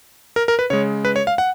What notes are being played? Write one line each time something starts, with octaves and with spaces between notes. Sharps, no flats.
A#4
A#4
B4
C#3 G#3 C#5
B4
C#5
F5
F#5